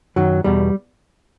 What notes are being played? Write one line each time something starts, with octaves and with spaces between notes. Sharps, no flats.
F#2 D#3 F#3
E2 B2 G3